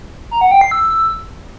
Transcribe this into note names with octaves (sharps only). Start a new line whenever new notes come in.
A#5
F#5
G5
C7
E6